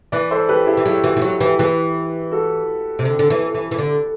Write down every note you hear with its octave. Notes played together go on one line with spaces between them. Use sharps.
E3 B4 D5
A4 C5
G4 B4
E4 G4
E3
F#3 E4 G4
E3 F#4
E3
F#3 F#4
E3 E4 G4
E3 G4 B4
F#4 A4
C3
D3
D3
E3
E3
E3
D3